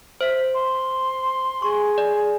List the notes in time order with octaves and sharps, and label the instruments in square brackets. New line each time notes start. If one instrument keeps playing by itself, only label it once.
[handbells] C5 [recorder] E5
[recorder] C6
[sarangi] G#4 [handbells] C#6
[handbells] D5